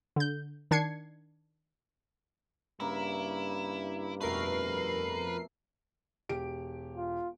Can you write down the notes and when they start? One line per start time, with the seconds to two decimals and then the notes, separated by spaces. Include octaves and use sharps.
0.16 D3 G6
0.71 D#3 D4 G#6 C7 C#7
2.80 G2 C#3 A#3 E4 A#5
4.21 F2 B2 A3 A#4 B4 C7
6.29 E1 G4 D7
6.97 F4